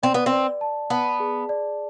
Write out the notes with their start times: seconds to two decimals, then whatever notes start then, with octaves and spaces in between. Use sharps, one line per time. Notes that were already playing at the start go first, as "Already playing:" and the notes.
0.03 C4 D5
0.14 B3
0.26 C4
0.32 D5
0.61 A5
0.90 B3 A5
1.20 G#4
1.49 D5